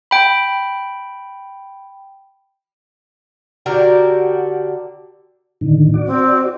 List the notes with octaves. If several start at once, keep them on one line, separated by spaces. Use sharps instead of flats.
G5 B5
D3 F#4 G4 A#4
A2 D3 D#3
F#4 D5
C4